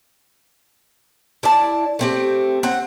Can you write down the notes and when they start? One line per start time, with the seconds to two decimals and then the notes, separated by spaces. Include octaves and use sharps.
1.43 E4 D5 A5
1.99 A3 C4 G4
2.63 C4 F#5